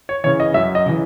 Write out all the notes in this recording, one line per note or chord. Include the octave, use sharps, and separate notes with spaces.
C#5
C#3 E3 C#5
D#5
F#2 E5
D#5
C#3 E3